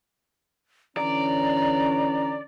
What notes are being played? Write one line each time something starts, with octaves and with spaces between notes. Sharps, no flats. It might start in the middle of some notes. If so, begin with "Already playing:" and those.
D3 E3 C#4 D5 A#5